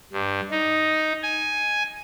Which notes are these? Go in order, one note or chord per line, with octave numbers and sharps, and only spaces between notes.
G2
D#4
G#5